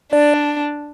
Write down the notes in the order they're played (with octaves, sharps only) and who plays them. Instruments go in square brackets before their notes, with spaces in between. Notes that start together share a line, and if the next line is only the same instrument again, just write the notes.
[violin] D4 [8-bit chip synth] D5